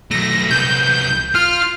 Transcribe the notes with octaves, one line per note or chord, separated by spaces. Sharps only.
B1 A3 A#6
C2 B3 G6
F4 F6